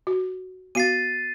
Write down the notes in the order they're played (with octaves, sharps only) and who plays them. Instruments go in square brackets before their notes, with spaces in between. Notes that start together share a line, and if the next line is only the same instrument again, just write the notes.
[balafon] F#4
[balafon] B3 F#4 F5 [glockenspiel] A6 C7 D#7